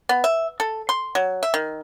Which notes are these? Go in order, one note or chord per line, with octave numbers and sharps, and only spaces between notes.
B3
E5
A4
C6
F#3
E5
D#3